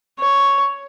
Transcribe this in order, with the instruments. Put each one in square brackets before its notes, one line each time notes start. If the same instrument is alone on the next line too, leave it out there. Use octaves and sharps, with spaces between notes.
[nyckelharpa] C#5